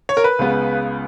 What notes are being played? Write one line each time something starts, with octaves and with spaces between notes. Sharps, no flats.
C#5
A#4
B4
C#2 C#3 G#3 B3